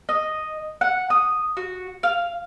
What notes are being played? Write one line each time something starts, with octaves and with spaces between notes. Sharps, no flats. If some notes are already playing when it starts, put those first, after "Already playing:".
D#5
F#5
D#6
F#4
F5